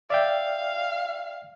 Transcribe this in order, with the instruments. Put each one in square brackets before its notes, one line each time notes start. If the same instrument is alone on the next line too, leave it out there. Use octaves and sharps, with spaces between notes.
[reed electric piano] D5 E5 G5 [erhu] F5